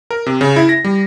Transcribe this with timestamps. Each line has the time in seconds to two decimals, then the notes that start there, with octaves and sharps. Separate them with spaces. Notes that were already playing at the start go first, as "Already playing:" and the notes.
0.11 A#4
0.26 C3
0.41 C#3
0.56 E4
0.69 A#6
0.84 G3